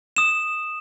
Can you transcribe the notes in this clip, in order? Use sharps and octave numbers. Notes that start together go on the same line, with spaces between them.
D#6 E7